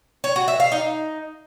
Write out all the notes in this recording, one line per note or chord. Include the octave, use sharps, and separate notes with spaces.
C#5
F#4
E5
F5
D#4